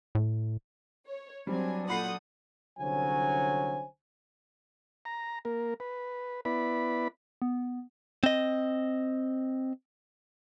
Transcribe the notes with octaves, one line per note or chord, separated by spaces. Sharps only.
A2
C#5
F#3 G3 C4 D4 G#5
A#2 A4 F#5 B5 D#6 G6 C7
C2 D3 F#3 C#4 C5 G#5
A#5
A#3 A#4
B4
B3 E4 B4 D5 B5
B3
C4 D#5